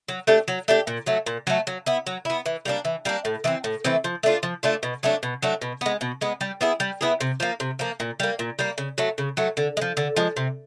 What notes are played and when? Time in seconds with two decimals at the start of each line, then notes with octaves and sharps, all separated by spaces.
0.09 F#3
0.27 A3 D4 G4
0.48 F#3
0.68 A3 D4 G4
0.87 A#2
1.06 F#3 A3
1.26 A#2
1.47 F#3 A3
1.67 F#3
1.86 B3 E4
2.07 F#3
2.25 B3 E4
2.46 E3
2.65 G3 A#3 D4
2.85 E3
3.05 G3 A#3 D4
3.25 A2
3.44 E3 A3 C4
3.64 A2
3.85 E3 A3 C4
4.04 F3
4.23 A3 D4 F4
4.43 F3
4.63 A3 D4 F4
4.83 B2
5.03 F#3 A3 D4
5.23 B2
5.42 F#3 A3 D4
5.62 B2
5.81 G#3 B3
6.01 B2
6.21 G#3 B3
6.41 G3
6.61 B3 E4 G#4
6.80 G3
7.01 B3 E4 G#4
7.21 C3
7.40 F3 A#3
7.60 C3
7.79 F3 A#3
8.00 A#2
8.20 G3 A#3
8.39 A#2
8.59 G3 A#3
8.78 C#3
8.98 F#3 A3
9.18 C#3
9.37 F#3 A3
9.57 D3
9.77 G#3
9.81 F3
9.97 D3
10.17 F3 G#3
10.37 C3